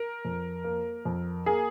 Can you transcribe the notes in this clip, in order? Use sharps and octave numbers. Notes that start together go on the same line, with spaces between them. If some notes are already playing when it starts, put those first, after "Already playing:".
Already playing: A#4
F2
A#3
F2
A#3 G#4